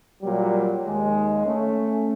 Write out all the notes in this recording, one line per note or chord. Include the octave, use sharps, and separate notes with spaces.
A#2 F#3 G3
D#2 G#3
A3 C#4